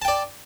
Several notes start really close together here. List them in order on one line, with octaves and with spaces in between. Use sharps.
A5 G5 D5